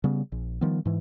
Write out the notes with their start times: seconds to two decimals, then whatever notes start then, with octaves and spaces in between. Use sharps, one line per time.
0.04 C#3 G3 B3
0.32 A#1
0.61 D#3 F3 G3 B3
0.85 G#2 E3